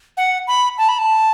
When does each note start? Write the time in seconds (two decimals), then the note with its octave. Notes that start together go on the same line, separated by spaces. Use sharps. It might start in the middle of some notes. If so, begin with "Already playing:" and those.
0.17 F#5
0.47 B5
0.78 A5
0.89 B5
0.99 A5